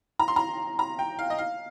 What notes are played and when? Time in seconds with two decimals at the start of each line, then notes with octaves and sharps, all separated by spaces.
0.19 A#5
0.28 C6
0.36 A#5
0.79 A#5
0.99 G5
1.19 F5
1.30 D#5
1.38 F5